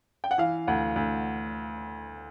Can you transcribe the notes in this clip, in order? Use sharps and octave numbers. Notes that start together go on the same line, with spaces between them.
G5
F#5
E3 F5
D2 F#5
D2